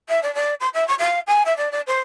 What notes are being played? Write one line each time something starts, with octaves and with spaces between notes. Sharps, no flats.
E5
D5
D5
C6
E5
C#6
F5
G#5
E5
D5
D5
C5